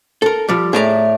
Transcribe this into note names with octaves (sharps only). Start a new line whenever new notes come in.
A4 A#4
F3 G3
A2 G#4 D5 E5 A#5